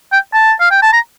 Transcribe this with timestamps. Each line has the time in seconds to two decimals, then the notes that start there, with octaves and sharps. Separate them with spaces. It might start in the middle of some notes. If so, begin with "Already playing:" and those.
0.12 G5
0.33 A5
0.60 F5
0.71 G5
0.82 A5
0.93 A#5